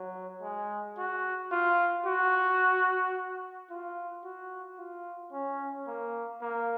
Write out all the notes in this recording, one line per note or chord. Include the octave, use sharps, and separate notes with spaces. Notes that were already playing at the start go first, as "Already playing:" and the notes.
Already playing: F#3
G#3
F#4
F4
F#4
F4
F#4
F4
C#4
A#3
A#3